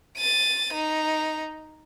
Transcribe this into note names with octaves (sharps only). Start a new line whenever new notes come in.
A6 D#7
D#4